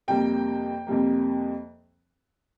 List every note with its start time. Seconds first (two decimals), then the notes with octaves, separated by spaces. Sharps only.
0.08 F2 C3 G3 A#3 G5
0.87 F2 C3 G3 A#3